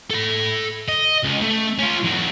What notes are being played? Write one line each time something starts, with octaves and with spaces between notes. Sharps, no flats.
A4 B5
D#5
C#2
A3
C#4 F4
E2 F#3